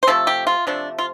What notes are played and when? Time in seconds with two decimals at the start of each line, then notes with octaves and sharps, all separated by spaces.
0.03 C5
0.07 C3 F3 A3 A4
0.27 G4
0.47 F4
0.67 C3 F3 A3 D4
0.98 F4